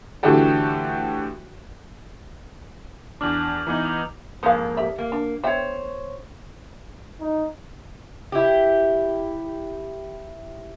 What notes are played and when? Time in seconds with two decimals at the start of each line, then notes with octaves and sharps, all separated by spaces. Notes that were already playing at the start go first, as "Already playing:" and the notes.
0.23 A2 D3 E3 F#4 G4 A4
3.21 E2 D4 D6 F6 F#7
3.67 E3 B3 D#4 A#5 D6 F#7
3.85 D6 F7
4.43 F2 G#2 A#3 C5 F5
4.77 G4 D5 E5
4.98 A#3
5.12 D4
5.44 B3 C5 C#5 E5 G5
7.21 D#4
8.32 E4 G4